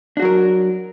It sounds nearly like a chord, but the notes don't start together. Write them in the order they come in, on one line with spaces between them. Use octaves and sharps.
D4 F#4 F#3 A#4